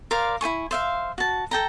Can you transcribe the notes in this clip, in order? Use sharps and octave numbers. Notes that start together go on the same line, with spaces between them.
A#4 C5 D5 F5
E4 C5 G#5 C#6
C5 E5 F5
F#4 A5
A4 G5 A#5